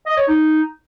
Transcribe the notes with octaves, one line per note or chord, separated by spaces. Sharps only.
D#5
C#5
D#4